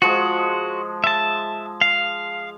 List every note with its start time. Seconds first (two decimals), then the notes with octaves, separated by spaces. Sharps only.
0.02 F3 G#3 F#4
1.04 E5 A5
1.81 F5